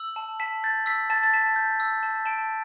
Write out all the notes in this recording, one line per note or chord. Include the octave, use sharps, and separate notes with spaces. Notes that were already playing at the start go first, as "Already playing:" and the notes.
Already playing: E6 F#7
A5
A5 B6
G6 A6
E6 B6
A5 A6
A6
A5 B6
G6
E6
A5
A5 D7